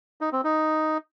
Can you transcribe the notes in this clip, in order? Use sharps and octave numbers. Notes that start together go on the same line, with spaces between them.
D#4
C4
D#4